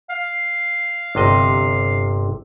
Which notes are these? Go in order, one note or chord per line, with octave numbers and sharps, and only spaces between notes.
F5
G1 C3 D#5